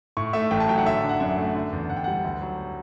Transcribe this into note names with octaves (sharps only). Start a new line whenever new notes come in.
A2 C#6
A3 E5
A1 G5
A5
F#3 G5
F#5
D3 E5
D4
F#5
F#2 E5
A3
D3
E2
E2 F#5
G5
G3 F#5
D2
F#3